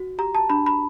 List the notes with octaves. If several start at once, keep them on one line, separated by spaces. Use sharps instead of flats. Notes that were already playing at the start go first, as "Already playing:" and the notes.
Already playing: F#4
G4 A#5
A5
D4 B5
B5